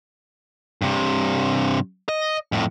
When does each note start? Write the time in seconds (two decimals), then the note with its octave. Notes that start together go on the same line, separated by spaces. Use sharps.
0.82 G2 C3
2.09 D#5
2.52 F2 A2